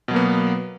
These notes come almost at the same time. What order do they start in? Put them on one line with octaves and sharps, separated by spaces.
B2 F#3 A#3 B3